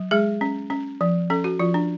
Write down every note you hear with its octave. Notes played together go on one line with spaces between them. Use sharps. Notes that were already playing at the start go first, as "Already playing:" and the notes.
Already playing: F#3
G#3 G#4
C#4
C#4
F3
C#4 A4
F#4
F3 F4
D4